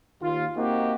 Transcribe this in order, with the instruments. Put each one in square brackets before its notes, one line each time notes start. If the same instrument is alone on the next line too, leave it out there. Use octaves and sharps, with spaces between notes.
[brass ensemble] D#2 F4
A#3 C4 D#4 F#4 G4